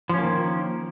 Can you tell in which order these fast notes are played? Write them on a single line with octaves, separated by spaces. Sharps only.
F3 C#4 A#3 D#3